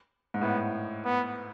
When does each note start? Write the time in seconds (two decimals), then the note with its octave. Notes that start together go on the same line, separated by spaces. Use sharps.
0.34 G#2
0.41 A2 B3
1.05 B3